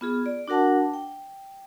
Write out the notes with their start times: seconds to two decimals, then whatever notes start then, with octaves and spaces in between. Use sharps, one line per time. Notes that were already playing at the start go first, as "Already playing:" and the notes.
0.01 B3 F4 G#4
0.26 D5
0.48 D4 F#4 A#4 F#5 A5
0.94 G5